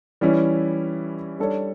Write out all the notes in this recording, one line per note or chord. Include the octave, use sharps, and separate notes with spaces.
E3 G3 C#4 E4
G3 D4 A4 C#5